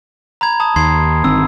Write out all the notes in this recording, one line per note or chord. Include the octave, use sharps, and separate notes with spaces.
A#5 B5 G#6
A5 D#6
D#2 C6 G#6 C7
G1 D#3 C4 E6